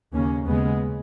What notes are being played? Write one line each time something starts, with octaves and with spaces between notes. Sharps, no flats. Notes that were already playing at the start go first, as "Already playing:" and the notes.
D#2 C#3 A#3 C#4
D#2 C#3 G#3 B3